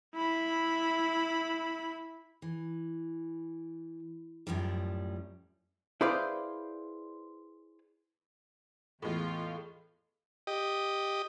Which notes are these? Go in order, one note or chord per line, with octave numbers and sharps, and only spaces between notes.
E4 B5
E3
F#2 A2 F3 G3
E4 G#4 B4 C5 D5 F5
E2 A2 G#3 F4
G4 D#5